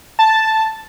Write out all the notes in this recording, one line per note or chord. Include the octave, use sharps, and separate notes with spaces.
A5